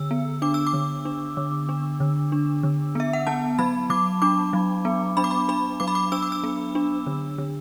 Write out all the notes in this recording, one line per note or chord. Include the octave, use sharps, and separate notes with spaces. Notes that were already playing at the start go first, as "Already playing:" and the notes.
Already playing: D3 E6
B3
D4 D6
E6
D6
D3
D4
D3
D4
D3
D4
D3
B3 E5
F#5
B3 A5
F#3 B5
F#3 D6
D4 D6
F#3
B3
D4 B5
D6
B5
D4 B5
F#3 D6
B5
D6
D4 E6
D6
E6
B3
D4
D3
D3